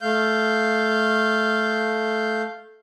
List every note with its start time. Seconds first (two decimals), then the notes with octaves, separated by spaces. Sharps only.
0.01 A3 F5 G6